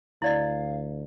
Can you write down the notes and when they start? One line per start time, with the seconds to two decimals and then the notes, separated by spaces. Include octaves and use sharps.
0.22 D2 E4 D5 D#5 F5